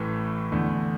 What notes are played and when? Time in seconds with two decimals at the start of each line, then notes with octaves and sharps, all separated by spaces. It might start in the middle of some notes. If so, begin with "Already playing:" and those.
Already playing: A1 A2 E3 A3
0.52 E2 D3 A3